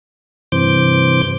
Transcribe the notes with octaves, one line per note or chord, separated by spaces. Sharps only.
G2 C3 E3 C5 D6 G6